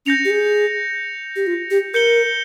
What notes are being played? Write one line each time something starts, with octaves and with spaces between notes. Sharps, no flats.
C#4 G6 A#6 C#7 F7
G4
G#4
G4
F4
G4
A#4 G6 C#7 G7